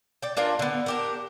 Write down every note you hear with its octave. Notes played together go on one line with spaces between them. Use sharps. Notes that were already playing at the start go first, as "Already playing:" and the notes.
D5 G5
D4 F4 A#4 G#5
D3 B3
D4 G4 A#4